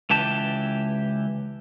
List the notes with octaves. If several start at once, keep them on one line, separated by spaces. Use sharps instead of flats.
C#2 E3 G4 A5